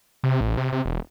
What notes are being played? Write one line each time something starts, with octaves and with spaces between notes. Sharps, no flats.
C3
A1
C3
C3
E1